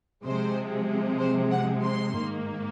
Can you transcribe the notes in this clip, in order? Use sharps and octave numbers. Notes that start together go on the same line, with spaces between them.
C3 F3 G#3 C5
C5
F#5
C6
G#2 D#3 A#3